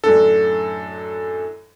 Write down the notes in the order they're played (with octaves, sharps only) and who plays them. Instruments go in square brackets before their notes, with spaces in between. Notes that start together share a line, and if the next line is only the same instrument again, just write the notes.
[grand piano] F#2 A2 D3 [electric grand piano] A4